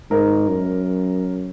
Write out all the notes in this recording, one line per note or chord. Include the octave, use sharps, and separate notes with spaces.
G#2 A#4
F#2